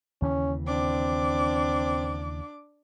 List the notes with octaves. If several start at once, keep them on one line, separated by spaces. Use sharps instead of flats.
D#2 C#3 E3 C#4
C4 D4 D6